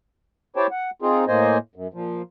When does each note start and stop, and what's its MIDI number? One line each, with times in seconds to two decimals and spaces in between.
0.56 0.67 64
0.56 0.67 67
0.56 0.67 72
0.56 0.67 73
0.56 0.67 79
0.56 0.67 81
0.71 0.90 78
1.02 1.25 60
1.02 1.25 63
1.02 1.25 65
1.02 1.25 68
1.28 1.58 45
1.28 1.58 58
1.28 1.58 72
1.28 1.58 75
1.28 1.58 80
1.76 1.88 42
1.94 2.22 46
1.94 2.22 53